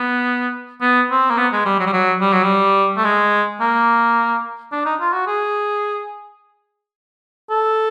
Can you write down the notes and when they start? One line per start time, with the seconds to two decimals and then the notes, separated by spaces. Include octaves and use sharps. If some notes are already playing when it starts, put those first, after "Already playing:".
Already playing: B3
0.82 B3
1.11 C4
1.30 A#3
1.37 B3
1.52 G#3
1.65 G3
1.79 F#3
1.86 G3
1.93 F#3
2.21 G3
2.32 F#3
2.43 G3
2.97 A3
3.04 G#3
3.60 A#3
4.72 D4
4.85 D#4
5.00 F4
5.13 F#4
5.27 G#4
7.50 A4